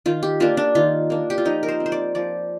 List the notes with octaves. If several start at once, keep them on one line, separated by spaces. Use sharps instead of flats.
D#3 F4
G4
A#3 D4 F4
D4
D#3 F4
A#3 D4
G4
F4
F3 D#4
A#4
C5
C4
C5
D5
F3 D5